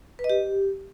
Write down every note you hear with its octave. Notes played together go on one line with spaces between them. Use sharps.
B4
D#5
G4